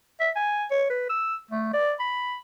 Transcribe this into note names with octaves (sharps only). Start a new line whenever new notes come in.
E5
G#5
C#5
B4
E6
A3
D5
B5